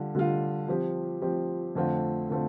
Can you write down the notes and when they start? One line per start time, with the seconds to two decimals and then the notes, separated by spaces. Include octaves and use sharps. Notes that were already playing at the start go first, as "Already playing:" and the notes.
Already playing: D3 G3 F4
0.15 D3 G3 F4
0.68 F3 C4 G4
1.22 F3 C4 G4
1.75 F2 D3 A3 C4 F4
2.30 D3 A3 C4 F4